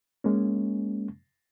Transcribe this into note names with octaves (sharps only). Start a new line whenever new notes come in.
G#3 A#3 C#4